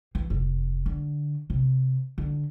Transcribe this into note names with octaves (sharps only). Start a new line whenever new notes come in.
E3
F1
D3
C3
D3